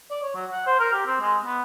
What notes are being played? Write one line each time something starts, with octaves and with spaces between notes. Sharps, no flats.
D5
C#5
F#3
F#5
C5
A#4
G4
C4
G#3
B3